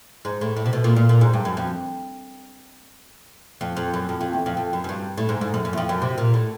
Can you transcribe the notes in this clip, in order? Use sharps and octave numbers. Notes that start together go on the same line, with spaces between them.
G#2
A2
A2
C3
B2
A#2
A#2
A#2
G#2
G2
F#2
F2
F2
F2
F#2
F2
F2
E2
F2
F2
F#2
F#2
G2
A2
G#2
G#2
F#2
F#2
E2
F2
F#2
C3
A#2
A2